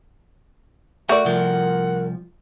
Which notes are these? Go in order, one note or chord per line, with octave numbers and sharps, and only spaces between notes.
A3 F#4 A#4 D5 F#5
C2 F3 A#4